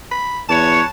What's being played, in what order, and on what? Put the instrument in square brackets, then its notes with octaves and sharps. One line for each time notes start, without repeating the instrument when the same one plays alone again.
[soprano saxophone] B5
[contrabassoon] E2 [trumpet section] B4 C#5 [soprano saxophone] A5